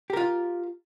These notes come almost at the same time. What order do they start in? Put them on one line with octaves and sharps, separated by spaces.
G4 A#4 F4